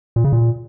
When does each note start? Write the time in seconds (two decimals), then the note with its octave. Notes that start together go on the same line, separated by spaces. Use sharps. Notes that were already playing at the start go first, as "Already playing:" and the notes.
0.16 A#2
0.24 C#3
0.32 A#2